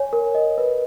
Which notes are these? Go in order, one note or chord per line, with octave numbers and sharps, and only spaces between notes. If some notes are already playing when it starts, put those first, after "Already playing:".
Already playing: C#5 G#5
A#4
D#5
B4